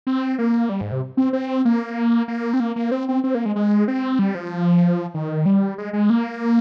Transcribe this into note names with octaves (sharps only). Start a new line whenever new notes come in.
C4
A#3
G3
G#2
C3
C4
C4
A#3
A#3
C4
A#3
A#3
C4
C4
C4
A#3
G#3
G#3
C4
G3
F3
D#3
G3
G#3
G#3
A#3